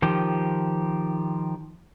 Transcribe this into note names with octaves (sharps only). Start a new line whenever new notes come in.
D#3 F3 G4